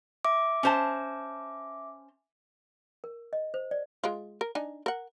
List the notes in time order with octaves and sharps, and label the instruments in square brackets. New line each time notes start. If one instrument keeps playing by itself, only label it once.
[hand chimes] E5 D6
[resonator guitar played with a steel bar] C#4 C5 A5
[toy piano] A#4
D#5
C5
D5
[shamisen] G#3 F4
A#4
D4 D#4 G#5
A#4 F#5